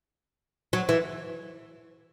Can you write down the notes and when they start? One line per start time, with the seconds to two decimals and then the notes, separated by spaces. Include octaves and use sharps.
0.73 F#3
0.89 E3